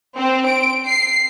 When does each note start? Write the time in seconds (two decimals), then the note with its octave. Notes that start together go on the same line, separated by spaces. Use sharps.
0.17 C4
0.47 D7
0.85 C7